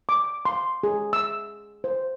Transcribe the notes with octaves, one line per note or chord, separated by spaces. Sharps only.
D6
C6
G#4
E6
C5